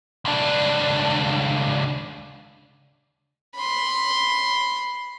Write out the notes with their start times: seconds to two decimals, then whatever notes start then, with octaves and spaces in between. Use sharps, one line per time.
0.25 C#2 D4
3.55 B5 C6